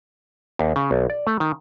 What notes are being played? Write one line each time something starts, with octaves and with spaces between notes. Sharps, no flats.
D#2
C#3
B1
D5
A3
D#3